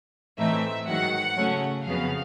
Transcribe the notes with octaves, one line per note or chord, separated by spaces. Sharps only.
A2 E3 A3 C4 D#4 E5
G#2 D#3 F#3 F#5
C#3 F#3 A3 C#4
F2 C#3 F#3 B3 F5